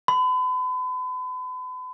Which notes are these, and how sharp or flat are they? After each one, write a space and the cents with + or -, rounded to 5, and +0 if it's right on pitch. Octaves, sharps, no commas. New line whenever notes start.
B5 +40